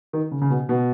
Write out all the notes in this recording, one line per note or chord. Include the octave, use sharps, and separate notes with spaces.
D#3
C#3
C#3
B2
B2